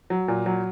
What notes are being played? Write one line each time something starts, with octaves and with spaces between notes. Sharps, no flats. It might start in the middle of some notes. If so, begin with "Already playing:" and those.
F#3
A#2
F#3